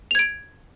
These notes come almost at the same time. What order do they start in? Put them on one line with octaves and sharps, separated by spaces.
F7 G#6 D7